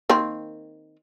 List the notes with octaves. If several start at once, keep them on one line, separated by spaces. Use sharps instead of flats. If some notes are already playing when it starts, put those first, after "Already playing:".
D#3 A#3 C4